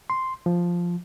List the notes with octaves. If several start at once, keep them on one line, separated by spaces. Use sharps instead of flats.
C6
F3